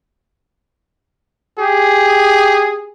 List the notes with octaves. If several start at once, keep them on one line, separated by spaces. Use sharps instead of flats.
G4 G#4